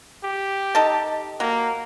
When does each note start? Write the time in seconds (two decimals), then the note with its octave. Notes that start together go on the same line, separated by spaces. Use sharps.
0.24 G4
0.75 D#4 A4 A5
1.40 F#3 A#3